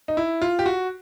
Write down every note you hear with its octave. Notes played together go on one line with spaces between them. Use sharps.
D#4
E4
F4
G4
F#4